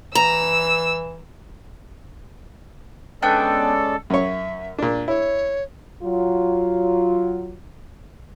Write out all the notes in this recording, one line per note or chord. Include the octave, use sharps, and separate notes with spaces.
E3 A#5 E6
G#3 B3 C#4 D4 A4 D5 G5
F#2 C#5 E5
A#2 D4
E4 C#5
F#3 F4